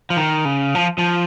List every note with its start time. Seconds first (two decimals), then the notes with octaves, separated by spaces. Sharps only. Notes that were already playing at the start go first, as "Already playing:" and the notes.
0.10 F3
0.17 D#3
0.45 C#3
0.75 F3
0.98 F3